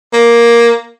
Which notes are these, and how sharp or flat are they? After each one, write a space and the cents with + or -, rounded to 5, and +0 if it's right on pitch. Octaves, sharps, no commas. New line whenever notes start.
A#3 +10